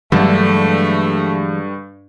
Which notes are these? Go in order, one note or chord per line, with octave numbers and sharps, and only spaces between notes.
G2 D3 E3 F#3 G#3 A3